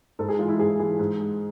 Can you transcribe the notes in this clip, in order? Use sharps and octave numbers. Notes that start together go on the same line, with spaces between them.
G#2 A4
G#4
E3 G#3 F4
E4
G#2 G#4
E3 G#3 G#4
G#2
G#3